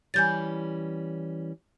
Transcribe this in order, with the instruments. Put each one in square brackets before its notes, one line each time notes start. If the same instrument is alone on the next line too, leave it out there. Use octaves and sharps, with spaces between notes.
[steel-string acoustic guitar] E3 G3 C#4 [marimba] G#5 G6 A6